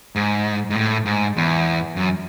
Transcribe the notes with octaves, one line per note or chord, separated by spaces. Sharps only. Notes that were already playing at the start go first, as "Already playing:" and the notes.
G#2
G#2
A2
G#2
E2
F#2